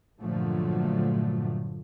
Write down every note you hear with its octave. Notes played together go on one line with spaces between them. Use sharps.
G2 A#2 D3 F3 F#3 A3